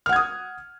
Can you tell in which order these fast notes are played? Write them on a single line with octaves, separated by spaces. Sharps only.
F6 F#5 G#6 D#6